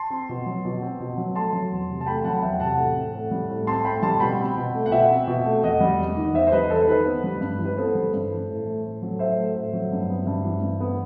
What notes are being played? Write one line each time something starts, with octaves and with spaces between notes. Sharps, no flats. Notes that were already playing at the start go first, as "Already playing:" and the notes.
Already playing: A5 C6
C4
B2
F#3
B2
C4
B2
F#3
A3 A5 C6
F#3
E2
C3
A5
A3 G5 B5
F#3 F#5 A5
F#5
E2 E5 G5
C3 F#5 A5
A2
C4
A2
G3
A2
C4 A5 C6
A2 G5 B5
G3 A5 C6
B2 G5 B5
C4
B2
A3
F#5
B2 E5 G5
C4
B2
A3
E2 D#5 F#5
G3
E2
D#3
E2 C5 E5
C5
G3 B4 D#5
E2 A4 C5
D#3 B4
B3
G3
G2
E3
B4
B3 A4 C5
G3
G2
E3
A2
A3
A2
F#3
A2 C5 E5
A3
A2
F#3
G2
B3
G2
E3
G2
B3